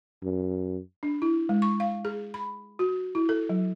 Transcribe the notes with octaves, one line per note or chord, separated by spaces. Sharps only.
F#2
D4
E4
G#3
C#6
F5
G#4
B5
F#4
E4
A4
F#3